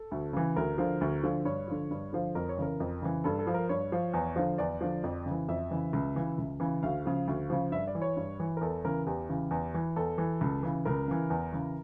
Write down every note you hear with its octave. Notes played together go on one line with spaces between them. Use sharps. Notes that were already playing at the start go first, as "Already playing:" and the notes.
Already playing: A4
D2
C#3 E3
D2 A#4
D3 F3
D2
D3 F3
G2 C#5
D3 F3
G2
D3 F3
F2 A#4
C#5
C#3 E3 A#4
F2
C#3 E3
G2 A4
A4
F3
A#4
G2 C#5
F3
E2
D3 F3
E2 D5
D3 F3
F2
C#3
E3
F2 E5
C#3 E3
C#2
C#3 E3
C#2
C#3 E3
D2 F5
C#3 F3
D2
C#3 F3
G2 E5
D5
E3
C#5
G2
E3
A#4
E2 A4
C#3 E3 A#4
E2 G4
C#3 E3
E2
E3
E2 A4
E3
C#2
C#3 E3
C#2 A#4
C#3 E3
E2
C#3 E3